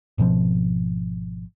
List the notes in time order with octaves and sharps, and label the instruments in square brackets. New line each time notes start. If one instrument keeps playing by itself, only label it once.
[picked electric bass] G#1 B2 F3 C4